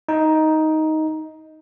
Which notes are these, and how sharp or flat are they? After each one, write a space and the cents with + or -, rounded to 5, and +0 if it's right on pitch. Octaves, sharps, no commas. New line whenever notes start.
D#4 +10